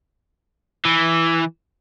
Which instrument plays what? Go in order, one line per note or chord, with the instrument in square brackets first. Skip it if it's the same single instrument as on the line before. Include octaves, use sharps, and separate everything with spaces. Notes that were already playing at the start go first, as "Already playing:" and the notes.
[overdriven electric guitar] E3